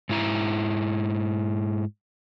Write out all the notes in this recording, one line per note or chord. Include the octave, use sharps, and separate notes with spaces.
G#2 E4 A#5